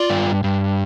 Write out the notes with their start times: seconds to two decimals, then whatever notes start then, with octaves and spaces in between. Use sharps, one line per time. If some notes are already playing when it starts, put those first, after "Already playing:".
Already playing: F4 D5
0.10 G2
0.44 G2